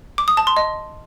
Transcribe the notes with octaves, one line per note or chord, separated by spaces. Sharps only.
D6
D#6
A5
C6
D#5